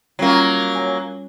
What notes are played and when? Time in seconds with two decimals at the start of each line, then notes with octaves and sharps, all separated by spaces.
0.19 F#3 G3 A#3 C#4 F4
0.75 C#5 G#5